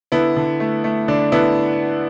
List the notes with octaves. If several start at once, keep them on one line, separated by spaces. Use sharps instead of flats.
D3 B3 E4
D3
A3
A3
D3 D4
D3 B3 E4